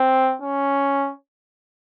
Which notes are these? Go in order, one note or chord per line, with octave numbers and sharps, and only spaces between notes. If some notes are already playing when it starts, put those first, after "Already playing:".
Already playing: C4
C#4